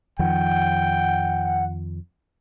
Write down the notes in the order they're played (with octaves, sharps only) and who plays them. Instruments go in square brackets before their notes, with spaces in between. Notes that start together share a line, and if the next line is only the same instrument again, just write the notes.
[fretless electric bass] F2 D#3 F3 [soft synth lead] F#5 [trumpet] G5